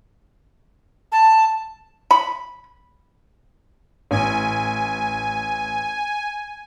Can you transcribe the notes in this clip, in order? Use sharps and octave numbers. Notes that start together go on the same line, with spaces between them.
A5
B5
A1 G#5